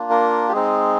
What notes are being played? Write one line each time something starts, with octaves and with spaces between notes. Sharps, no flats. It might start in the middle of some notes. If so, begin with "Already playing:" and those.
Already playing: A#3 D4 F4
A#4
G4
G#3 C4 D#4 G#4